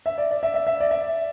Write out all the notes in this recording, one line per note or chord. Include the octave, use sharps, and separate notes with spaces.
E5
D5
D5
E5
E5
E5
D5
E5